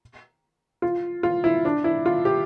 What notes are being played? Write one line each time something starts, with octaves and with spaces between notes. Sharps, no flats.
F4
F4
E4
D4
E4
F4
G4